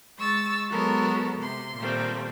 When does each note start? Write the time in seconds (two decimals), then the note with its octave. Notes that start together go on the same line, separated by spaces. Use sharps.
0.19 G#3 C#6 E6 A6
0.69 F#3 G#3 B3 F#4 A4 A#4
1.39 C3 C6
1.78 A#2 D#3 G3 A3 C4